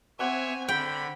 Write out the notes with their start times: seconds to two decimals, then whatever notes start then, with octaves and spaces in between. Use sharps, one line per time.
0.19 C4 C5 C#5 E5 F#5 G#5 D6
0.69 D3 G5 B5